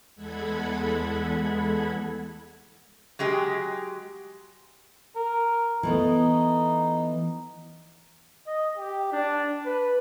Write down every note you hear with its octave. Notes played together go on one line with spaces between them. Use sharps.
E2 G#3 A4 F#5 B5 G#6
F#3 G#3 G4 G#4
A#4
E3 A3 B3 D#4
D#5
G4
D4
B4